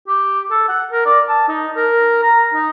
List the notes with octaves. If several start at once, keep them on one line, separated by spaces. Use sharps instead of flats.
G4
A4
F#5
A#4
D5
A5
D#4
A#4
A#5
D#4